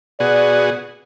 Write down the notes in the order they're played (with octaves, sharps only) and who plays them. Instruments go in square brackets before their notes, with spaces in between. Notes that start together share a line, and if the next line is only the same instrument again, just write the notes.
[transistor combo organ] B2 F#4 G#4 [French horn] D5